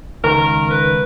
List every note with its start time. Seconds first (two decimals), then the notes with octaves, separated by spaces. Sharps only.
0.24 C#2 D#3 A#4
0.70 B4